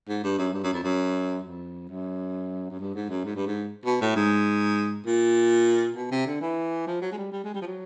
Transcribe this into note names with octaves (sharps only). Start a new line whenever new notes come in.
G#2
G2
F#2
G2
F#2
F2
F#2
F2
F#2
F#2
G2
G#2
F#2
G#2
G2
G#2
B2
A2
G#2
A#2
B2
C3
D3
E3
F3
F#3
G#3
G3
G3
G#3
G3
F3
F#3